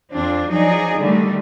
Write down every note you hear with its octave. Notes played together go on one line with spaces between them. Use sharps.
F2 C4 D4 F4
F3 F#3 D#4 G#4 D5
D3 D#3 G3 A3